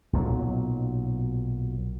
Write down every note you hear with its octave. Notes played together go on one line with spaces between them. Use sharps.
B1 A#2 D#3 F#3